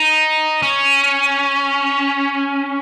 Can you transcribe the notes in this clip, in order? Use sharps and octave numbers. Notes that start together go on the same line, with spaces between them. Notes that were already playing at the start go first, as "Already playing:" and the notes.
Already playing: D#4
C#4